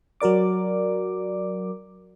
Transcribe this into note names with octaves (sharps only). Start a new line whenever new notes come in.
F#3 F#4 A#4 D5 D6